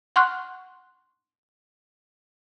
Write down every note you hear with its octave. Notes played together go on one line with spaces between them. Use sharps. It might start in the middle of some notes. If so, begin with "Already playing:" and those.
F#5 C6 C#6 F6 F#6